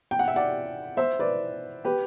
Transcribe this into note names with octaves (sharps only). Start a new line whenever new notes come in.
G5
F#5
E5
D5 F#5
C5 E5
B4 D5
G4 B4